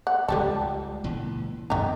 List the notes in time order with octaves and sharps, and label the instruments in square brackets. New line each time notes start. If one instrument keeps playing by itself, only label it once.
[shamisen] F#5
[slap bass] C#2 F3 G#3 [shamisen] G3 G4 A4
[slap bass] C#2 A#2 E3
[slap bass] F#2 B3 [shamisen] D#3 A#5